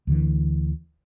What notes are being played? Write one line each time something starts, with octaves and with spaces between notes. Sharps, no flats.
D2 D3 E3